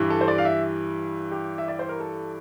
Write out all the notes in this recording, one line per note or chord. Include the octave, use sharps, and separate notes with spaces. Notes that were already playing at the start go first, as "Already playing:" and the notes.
Already playing: G2 E3 G3
A4
C5
D5
F5
E5
G4
E5
D5
C5
A#4
A4